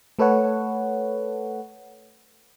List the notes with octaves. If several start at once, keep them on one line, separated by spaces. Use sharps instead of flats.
A3 A4 B4 C#5 F#5